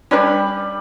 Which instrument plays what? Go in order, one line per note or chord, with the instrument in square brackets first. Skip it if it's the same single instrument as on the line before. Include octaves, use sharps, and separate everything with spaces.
[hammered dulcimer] G3 B5 [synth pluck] C#4 D4 B4